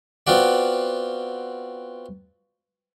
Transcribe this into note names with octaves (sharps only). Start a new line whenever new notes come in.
B3 C4 F4 F#4 D5